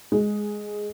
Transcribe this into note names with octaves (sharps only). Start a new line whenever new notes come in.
G#3